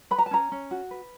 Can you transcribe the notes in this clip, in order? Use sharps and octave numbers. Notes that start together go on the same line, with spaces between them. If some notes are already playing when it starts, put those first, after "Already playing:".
B4 B5
A#5
A5
C#4 A#5
C#4
F#4
B4